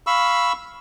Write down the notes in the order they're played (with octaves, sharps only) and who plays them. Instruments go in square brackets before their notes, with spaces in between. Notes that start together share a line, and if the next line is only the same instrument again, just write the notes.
[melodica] F5 B5 C#6 E6